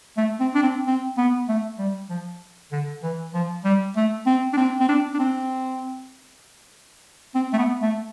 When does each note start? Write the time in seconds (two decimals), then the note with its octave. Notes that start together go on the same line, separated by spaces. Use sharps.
0.17 A3
0.40 C4
0.54 D4
0.63 C4
0.87 C4
1.17 B3
1.48 A3
1.79 G3
2.10 F3
2.72 D3
3.03 E3
3.34 F3
3.65 G3
3.96 A3
4.26 C4
4.53 D4
4.57 C4
4.80 C4
4.88 D4
5.14 D4
5.19 C4
7.35 C4
7.53 A3
7.58 B3
7.82 A3